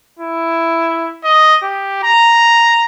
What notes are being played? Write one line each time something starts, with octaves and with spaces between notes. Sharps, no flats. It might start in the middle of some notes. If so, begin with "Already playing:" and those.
E4
D#5
G4
A#5